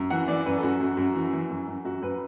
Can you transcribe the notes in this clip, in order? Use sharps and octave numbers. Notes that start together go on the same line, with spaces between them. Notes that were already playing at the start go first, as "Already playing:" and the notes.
Already playing: F#2
E3 F#5
E3 D5
F#2 B4
A4
F#2 F#4
F#2
F#2
E3
E3
F#2
F#2
F#2 F#4
F#2 B4